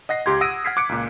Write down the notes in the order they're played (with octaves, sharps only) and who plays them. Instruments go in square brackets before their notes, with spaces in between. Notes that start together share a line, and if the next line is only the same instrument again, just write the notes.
[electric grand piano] D#5 F#5 A#6 C7
C#2 G4 C6 G#6
F#5 D#6 E6 A#6 D7 D#7
F#5 F6 G#6 B6 C7
D6 F#6 C#7 D7
C#2 A#2